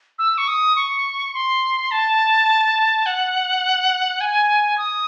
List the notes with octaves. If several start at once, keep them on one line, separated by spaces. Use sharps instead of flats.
E6
C#6
D#6
C#6
C6
A5
F#5
G#5
D#6